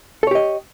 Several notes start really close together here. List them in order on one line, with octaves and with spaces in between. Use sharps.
A4 C#5 G4 D#5